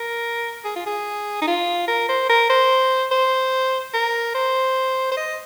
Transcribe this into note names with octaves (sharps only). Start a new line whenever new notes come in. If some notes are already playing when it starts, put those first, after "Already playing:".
Already playing: A#4
G#4
F4
G#4
D#4
F4
A#4
C5
A#4
C5
C5
A#4
C5
C5
D#5